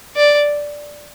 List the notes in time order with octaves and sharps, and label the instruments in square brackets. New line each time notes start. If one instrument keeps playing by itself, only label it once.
[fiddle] D5